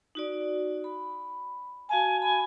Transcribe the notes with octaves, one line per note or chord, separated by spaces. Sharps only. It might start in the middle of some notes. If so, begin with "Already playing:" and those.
D#4 F#4 D5
B5
F#4 F5 G#5 A5
G#5 B5